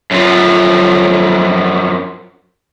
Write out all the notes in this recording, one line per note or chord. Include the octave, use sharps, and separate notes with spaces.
F#2 F3